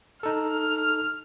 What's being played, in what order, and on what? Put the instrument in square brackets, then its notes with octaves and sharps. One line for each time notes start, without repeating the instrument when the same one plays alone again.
[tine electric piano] D#4 A4 [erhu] F6